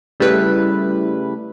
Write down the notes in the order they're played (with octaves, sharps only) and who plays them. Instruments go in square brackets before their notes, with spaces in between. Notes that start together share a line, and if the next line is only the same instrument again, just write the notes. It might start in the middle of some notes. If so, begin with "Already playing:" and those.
[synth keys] C#3 G3 A3 E4 B4